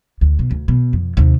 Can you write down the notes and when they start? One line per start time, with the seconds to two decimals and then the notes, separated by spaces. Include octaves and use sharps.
0.21 D2
0.39 B2
0.51 D2
0.68 B2
0.93 F2
1.17 D#2 C3